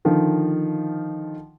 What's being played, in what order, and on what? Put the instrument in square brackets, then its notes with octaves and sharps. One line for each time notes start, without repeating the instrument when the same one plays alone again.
[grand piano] D3 D#3 F3